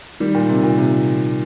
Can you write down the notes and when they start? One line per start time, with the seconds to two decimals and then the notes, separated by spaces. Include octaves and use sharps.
0.20 D#3 G3
0.35 A#2
0.49 C3
0.63 A#2
0.78 C3